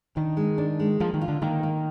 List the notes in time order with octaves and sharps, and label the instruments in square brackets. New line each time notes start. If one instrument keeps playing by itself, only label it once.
[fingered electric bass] D#3 [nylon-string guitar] D4
[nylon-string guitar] G#3
D4
G#3
[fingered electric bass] F3 [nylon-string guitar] A#3
[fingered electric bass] D#3
[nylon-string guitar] F4
[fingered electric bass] D3
[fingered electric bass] D#3 [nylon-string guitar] A#3
[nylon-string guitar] A#3